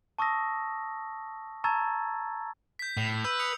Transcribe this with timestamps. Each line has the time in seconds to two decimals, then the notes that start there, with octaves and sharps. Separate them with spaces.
0.19 A5 C#6 D#6 E6 A#6
1.64 A5 A#5 C#6 E6 G#6 A6
2.79 G6 B6
2.97 A2 B6
3.24 B4 E6 G6
3.39 D#6 C#7 F7